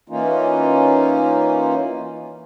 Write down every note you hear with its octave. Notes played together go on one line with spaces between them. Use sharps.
E3 A#3 C#4 D#4 F4